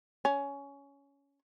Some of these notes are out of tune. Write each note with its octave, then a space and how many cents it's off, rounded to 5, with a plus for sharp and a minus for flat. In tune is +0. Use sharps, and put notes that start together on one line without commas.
C#4 +15